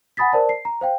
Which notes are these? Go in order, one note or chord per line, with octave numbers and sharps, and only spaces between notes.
F#5 G#5 B5 D#6 A6 B6
A#4 C5 D5 A5
C7
A#5
C5 F5 G5